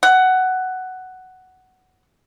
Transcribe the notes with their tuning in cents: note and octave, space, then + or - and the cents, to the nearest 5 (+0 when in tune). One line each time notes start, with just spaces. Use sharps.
F#5 +10